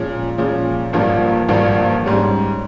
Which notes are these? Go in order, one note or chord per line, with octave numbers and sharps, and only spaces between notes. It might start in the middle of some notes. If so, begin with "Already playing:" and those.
Already playing: A#2 F3 G#3 C#4
A#2 F3 G#3 C#4
G#1 G2 F3 A#3 F4
G#1 G2 F3 A#3 F4
G#2 G3 C#4